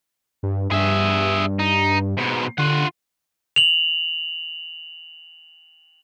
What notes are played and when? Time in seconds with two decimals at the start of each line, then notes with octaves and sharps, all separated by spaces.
0.43 G2
0.71 G2 G#4 E5
1.60 D#4
2.18 G#2 B2
2.58 D3 F4 F#5
3.56 F7 F#7